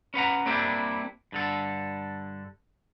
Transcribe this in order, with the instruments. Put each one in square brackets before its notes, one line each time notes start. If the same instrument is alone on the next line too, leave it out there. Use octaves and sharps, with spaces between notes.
[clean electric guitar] C#4 B4 F#5 A#5
G3 A#3 C4 D4 E4 G4
G2 D3 A4